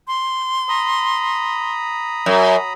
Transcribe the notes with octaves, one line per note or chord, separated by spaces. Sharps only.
C6
A#5 B5 D#6
F#2